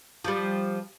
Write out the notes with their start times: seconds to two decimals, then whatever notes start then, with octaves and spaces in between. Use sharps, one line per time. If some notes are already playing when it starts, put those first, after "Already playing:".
0.25 F3 G3